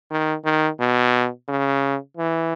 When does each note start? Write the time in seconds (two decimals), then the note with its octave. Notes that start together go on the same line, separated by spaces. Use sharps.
0.11 D#3
0.45 D#3
0.80 B2
1.48 C#3
2.17 E3